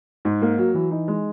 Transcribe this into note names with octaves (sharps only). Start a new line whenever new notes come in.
G#2
A#3
F#3
E3
D#4
G#3